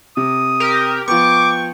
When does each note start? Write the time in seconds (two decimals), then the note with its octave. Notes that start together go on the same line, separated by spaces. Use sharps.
0.17 C3 D#6
0.60 G4 A#4
1.08 F3 B3 G5 C#6 D6